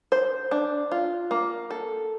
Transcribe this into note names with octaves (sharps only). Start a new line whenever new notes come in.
C5
D4
F4
A#3
A4